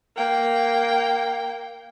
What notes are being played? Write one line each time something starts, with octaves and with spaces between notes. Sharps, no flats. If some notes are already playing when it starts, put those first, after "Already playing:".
A#3 G5